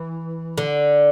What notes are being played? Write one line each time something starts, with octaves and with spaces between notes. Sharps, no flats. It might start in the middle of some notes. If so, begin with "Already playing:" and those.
Already playing: E3
D3